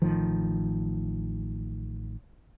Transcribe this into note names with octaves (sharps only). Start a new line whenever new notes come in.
A1 A2 D#3 F3